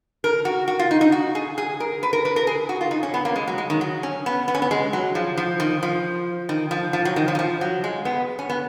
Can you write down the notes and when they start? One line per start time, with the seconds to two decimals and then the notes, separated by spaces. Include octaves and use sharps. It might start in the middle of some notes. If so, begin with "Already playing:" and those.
0.24 A#4
0.45 F#4
0.68 F#4
0.79 F4
0.91 D#4
1.01 D#4
1.12 F#4
1.35 G#4
1.58 G#4
1.80 A#4
2.03 B4
2.13 A#4
2.25 B4
2.36 A#4
2.47 G#4
2.69 F#4
2.81 F4
2.91 D#4
3.03 C#4
3.14 B3
3.25 A#3
3.36 G#3
3.48 F#3
3.58 G#3
3.70 D#3
3.81 F#3
4.03 C#4
4.26 B3
4.48 B3
4.55 C#4
4.62 B3
4.71 G#3
4.93 F#3
5.15 F3
5.37 F3
5.60 D#3
5.83 F3
6.49 D#3
6.71 F3
6.93 F3
7.05 F#3
7.16 D#3
7.28 F3
7.35 D#3
7.39 F3
7.61 F#3
7.84 G#3
8.05 B3
8.39 C#4
8.50 B3